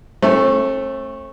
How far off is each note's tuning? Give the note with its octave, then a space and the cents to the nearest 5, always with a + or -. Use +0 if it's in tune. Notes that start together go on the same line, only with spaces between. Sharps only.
A3 +0 C4 +45